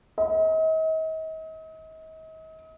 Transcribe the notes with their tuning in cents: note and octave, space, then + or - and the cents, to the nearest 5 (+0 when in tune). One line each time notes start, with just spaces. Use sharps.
D#5 +40